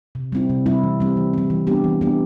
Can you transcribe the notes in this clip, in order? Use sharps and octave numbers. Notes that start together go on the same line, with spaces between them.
C3
G3 C4 E4
C3
G3 C4 E4
E3
G3 C4
E3
G3 C4
E3
G3 B3 D4 G4
E3
G3 B3 D4 G4